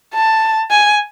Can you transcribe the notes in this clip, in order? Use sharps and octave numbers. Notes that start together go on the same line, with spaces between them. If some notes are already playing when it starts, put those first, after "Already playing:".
A5
G#5